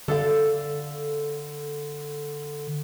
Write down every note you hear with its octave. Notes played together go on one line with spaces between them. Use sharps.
D3 A4 D5 F5